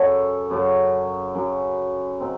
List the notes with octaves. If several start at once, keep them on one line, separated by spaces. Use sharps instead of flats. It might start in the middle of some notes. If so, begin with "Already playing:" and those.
Already playing: F#2 C#3 F#3 A4 C#5
F#2 C#3 F#3
F#2 C#3 F#3
C#3 F#3 C4 D#4